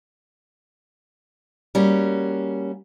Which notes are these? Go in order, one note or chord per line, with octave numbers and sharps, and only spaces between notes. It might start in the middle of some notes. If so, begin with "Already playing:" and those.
G3 A#3 C#4 F#4